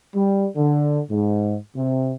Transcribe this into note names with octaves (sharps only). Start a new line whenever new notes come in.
G3
D3
G#2
C3